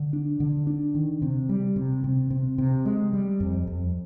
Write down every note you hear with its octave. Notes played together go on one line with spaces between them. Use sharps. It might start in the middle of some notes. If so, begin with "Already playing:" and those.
Already playing: D3
D4
D3
D4
D#3
C3
G3
C3
C3
C3
C3
G#3
G3
F2
F2